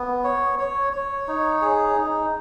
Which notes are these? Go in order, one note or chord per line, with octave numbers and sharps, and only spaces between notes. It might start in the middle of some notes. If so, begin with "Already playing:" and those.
Already playing: B3
C#5
C#5
C#5
D#4
G#4
D#4